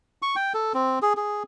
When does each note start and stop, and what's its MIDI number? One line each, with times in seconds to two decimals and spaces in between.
0.22 0.36 85
0.36 0.53 79
0.54 0.73 69
0.74 0.99 60
1.02 1.13 68
1.17 1.43 68